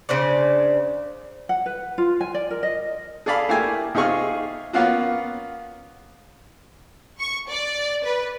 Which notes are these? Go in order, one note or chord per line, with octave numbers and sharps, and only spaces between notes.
C#3 D4 C5 D5
F#5
B4
F4
G#5
D5
A#4
D#5
G#4 A4 D5 F5 B5
A3 A#3 E4 G4 G#5
C3 D#4 F4 G#4 C#6 F6
A#3 B3 C#4 F4 F#4
C#6
D5
B4